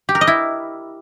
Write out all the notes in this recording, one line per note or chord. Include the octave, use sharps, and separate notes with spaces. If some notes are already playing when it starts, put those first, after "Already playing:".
G4
A#4
D#5
E4